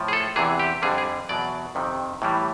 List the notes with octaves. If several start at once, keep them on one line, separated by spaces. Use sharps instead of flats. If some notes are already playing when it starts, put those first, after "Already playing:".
Already playing: A2 F3
G#4
A4
E2 C3 E3 G#4
G4
F2 D3 G3 G#4
G#4
E2 B2 F#3 D5
F2 C3 D#3
A2 E3 G3